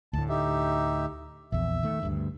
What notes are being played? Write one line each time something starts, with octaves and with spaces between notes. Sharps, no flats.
D2 A2 A5
D#4 G4 E5
A#1 E2 E5
D#3 A3
D2 G2